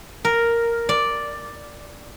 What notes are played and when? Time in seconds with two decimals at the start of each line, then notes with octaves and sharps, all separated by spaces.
0.25 A#4
0.89 D5